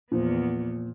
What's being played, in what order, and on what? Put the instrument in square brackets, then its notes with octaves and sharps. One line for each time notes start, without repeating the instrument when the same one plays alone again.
[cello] E2 B3 [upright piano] A#2 F3